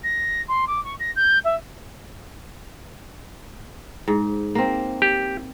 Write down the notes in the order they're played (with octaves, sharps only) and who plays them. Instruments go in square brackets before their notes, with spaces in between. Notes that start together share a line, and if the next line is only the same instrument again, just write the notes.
[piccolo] A#6
C6
D6
C#6
A#6
G6
E5
[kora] G#2
A#3 C4
[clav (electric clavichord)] G4